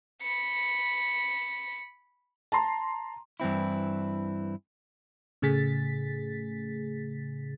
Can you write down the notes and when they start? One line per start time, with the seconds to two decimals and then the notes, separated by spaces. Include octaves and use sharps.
0.22 B5 C#7
2.52 A5 A#5 C6
3.40 G2 E3 C4 E4
5.42 A2 C#3 A3 G#4 A6 B6